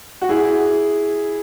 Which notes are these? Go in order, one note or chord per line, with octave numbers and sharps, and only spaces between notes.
F#4
E4 G#4